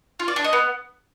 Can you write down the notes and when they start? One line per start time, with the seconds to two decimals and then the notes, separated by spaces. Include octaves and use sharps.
0.20 F4
0.28 D5
0.36 D4
0.44 D#5
0.53 B3